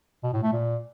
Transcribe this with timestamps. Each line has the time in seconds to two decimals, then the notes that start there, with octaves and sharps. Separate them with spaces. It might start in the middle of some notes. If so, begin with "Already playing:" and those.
0.23 B2
0.33 A2
0.43 A3
0.52 A#2